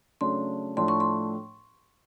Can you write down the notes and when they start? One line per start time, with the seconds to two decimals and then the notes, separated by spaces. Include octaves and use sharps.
0.21 C#3 F#3 A3 D4 C6
0.77 A2 F3 A3 D4 C6
0.88 C#6
1.00 C6